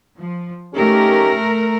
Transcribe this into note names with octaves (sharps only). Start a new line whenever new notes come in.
F3
A3 C#4 D#4 G4 A#4